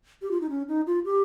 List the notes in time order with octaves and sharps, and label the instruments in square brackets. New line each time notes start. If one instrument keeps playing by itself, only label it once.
[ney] G4
F4
D#4
C#4
D#4
F4
G4